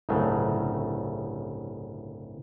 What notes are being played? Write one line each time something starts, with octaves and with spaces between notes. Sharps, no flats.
G1 C2 A2 C#3 F#3 A3